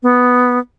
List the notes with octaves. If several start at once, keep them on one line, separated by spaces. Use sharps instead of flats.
B3